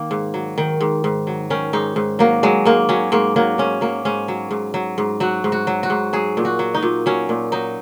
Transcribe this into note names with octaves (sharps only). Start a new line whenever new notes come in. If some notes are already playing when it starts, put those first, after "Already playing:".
Already playing: D#3 A#3 D#4
G#2
F#3
D#3
G#2
G#2
F#3
D#3 C#4
G#2 D#4
G#2
F#3 A#3
F#3 G#3
G#2 A#3
F#3 C#4
G#2 A#3
F#3 A#3
G#2 C#4
F#3 A#3
G#2 C#4
F#3
G#2
F#3
G#2
F#3 F#4
G#2
F#4
F#3
F#4
G#2
F#3 G#4
A#2
F#4
F#3
D#4
A#2
F#3 C#4
A#2
F#3 D#4